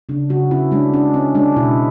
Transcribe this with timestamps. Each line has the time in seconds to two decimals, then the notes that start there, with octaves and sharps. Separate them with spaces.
0.09 C#3 D4
0.29 C#3 F#4
0.51 C#4 E4
0.72 G#3 D4
0.94 C#4 D4
1.14 C#4
1.35 G#3 D4
1.56 B2 E4